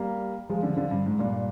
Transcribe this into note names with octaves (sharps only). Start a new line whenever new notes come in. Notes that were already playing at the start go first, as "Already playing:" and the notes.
Already playing: G3 A#3
F3 G#3
D3 F3
D3 F3
G2
G#2
G2 A#2